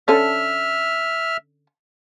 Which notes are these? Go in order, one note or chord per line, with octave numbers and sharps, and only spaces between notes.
D3 C#4 A4 E5 F6